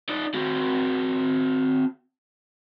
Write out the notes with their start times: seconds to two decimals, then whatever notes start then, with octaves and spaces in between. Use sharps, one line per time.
0.09 D#4 D5
0.34 C4 F#4